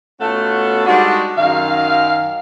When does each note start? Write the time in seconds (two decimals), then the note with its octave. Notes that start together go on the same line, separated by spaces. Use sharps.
0.20 B2 A3 C#4 F4 A4 F#5
0.85 G3 G#3 D4 D#4 F#4
1.37 F#2 D#3 F5